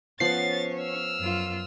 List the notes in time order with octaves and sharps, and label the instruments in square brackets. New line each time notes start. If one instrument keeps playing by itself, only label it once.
[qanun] F3 B3 F#5 [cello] C#4 C#5 [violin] A6 [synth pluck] C7
[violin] E6 F6
[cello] F#2 F4